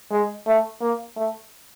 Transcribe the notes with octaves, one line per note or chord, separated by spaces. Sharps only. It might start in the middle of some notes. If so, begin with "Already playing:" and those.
G#3
A3
A#3
A3